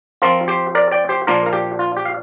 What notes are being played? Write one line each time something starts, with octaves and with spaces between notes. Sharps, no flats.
F3 C4 F4 A#4
G4 C5
A#4 D5
D5 G5
G4 C5
A#2 F3 A#3 D4 F4 A#4
A#4
G4
F4
G4
F5